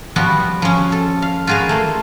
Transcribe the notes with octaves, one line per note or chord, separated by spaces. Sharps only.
F3 G3 B3 F#4
F3 C#4
A4
F5
F4 F#4 G#4 A#4 F5
A3 A#3 C5